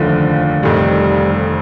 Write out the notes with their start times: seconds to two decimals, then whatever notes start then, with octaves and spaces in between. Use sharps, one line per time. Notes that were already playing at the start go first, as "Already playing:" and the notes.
Already playing: F1 D#2 D3 F3
0.63 F1 F2 D#3 G3